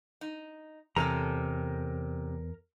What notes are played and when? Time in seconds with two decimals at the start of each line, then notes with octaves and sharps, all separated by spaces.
0.21 D#4
0.96 E2 C3 C4 C#4 A4 A#4 A#5